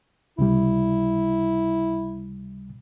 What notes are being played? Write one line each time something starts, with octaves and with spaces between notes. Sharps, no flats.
C#2 C3 G3 E4